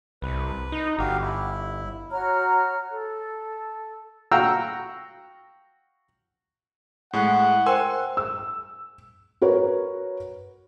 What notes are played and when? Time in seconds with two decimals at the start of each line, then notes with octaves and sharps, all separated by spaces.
0.22 C2 B4
0.72 D#4
0.99 G1 F#4 G4 F5
1.22 E4
2.11 F#4 C#5 A#5 F6
2.91 A4
4.31 F#4 F5 G5 A#5 E6
7.13 A2 G#3 F#5
7.66 A#4 C5 G5 G#5 C6 E6
8.17 E6
9.41 F#4 A#4 B4 C#5